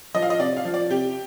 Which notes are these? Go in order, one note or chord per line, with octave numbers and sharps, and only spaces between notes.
F3 D#5
F5
D#5
C3 D5
F5
F3
D5
C3 G4